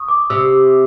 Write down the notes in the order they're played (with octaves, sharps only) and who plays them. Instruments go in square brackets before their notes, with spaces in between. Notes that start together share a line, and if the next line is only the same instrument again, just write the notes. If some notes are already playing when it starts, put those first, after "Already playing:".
Already playing: [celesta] C#6 D#6
D6
[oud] C3 [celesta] E6